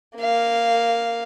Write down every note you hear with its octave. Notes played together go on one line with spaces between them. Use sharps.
A#3 F5